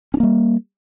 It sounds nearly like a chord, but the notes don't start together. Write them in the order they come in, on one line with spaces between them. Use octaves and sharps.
C#4 D4 A#3 G3